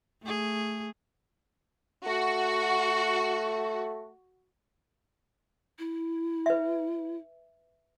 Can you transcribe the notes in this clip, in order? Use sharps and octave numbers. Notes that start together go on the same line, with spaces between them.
A3 G#4
A3 F#4
E4
B4 E5